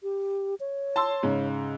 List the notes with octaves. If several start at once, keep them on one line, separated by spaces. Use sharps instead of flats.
G4
C#5
A5 C6 E6
G#2 C#3